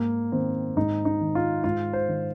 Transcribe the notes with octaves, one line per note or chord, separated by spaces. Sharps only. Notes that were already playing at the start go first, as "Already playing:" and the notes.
Already playing: G#2 A#3
D#3 C4
G#2 D#4
D#4
D#3
F4
G#2 F4
C5
D#3